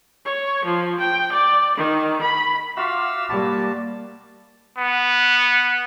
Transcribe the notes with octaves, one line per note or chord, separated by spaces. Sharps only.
C#5
F3
G5
D5
D#3
B5
F4 F#4 E5 F5 D6 E6
G3 A#3 A5 B5
B3